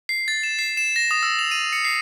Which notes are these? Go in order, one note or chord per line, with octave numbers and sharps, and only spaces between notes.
C7
A6
E7
C7
E7
A#6
D#6
E6
F7
D#7
C#7
C7